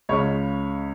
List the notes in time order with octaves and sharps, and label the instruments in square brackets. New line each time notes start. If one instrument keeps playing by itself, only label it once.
[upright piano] C#2 C#3 G#3 C#5